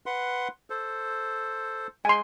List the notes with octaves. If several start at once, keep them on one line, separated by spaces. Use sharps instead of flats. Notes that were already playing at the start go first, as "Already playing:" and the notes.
B4 F#5 C6
A4 C5
G#3 G#5 C6